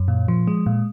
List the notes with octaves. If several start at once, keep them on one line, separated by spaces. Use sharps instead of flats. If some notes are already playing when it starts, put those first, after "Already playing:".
Already playing: F#2
A#2
F3
G#3
A#2